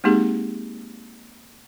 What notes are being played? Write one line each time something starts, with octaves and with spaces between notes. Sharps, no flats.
G#3 A#3 C4 D#4 G4 G#4